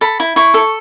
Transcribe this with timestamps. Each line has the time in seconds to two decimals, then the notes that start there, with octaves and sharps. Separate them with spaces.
0.01 A4 B5
0.20 E4
0.36 E4 C#6
0.54 A4